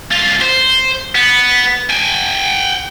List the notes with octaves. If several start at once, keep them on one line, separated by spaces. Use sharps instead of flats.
C2 F4
C5
B3
G5 G#5